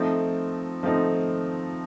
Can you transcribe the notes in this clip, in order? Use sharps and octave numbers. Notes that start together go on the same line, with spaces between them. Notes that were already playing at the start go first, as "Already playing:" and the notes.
Already playing: F3 A3 C4 D#4
F3 A3 C4 D#4